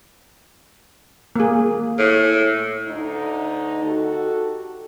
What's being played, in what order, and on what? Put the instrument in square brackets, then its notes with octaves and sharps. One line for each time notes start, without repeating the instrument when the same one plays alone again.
[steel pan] A#3 G#4
[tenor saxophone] A2
[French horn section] D2 D3 D#4
F#4 G4 A4